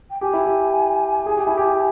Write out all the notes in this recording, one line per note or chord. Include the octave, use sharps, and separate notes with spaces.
G5
G4 G#5
E4
G4
G#4
G4
E4
G4